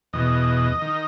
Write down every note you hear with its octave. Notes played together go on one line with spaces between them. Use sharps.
E2 B2 D#5
D#3